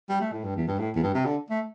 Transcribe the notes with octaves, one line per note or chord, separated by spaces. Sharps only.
G3
A3
A2
G2
E2
G2
A2
E2
G2
C3
D3
A3